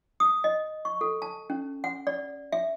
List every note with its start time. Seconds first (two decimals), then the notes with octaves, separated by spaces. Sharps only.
0.20 D#6
0.44 D#5
0.85 C#6
1.01 A4
1.22 A5
1.50 C#4
1.84 F#5
2.07 D5
2.52 E5